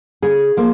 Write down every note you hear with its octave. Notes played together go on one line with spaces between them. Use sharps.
C#3 G#4
F3 A#3